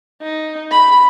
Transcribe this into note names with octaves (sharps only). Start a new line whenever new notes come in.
D#4
B5